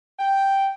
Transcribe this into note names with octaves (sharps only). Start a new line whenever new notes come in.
G5